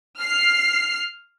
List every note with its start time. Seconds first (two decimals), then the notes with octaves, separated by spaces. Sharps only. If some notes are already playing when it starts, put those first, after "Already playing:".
0.19 F6 C7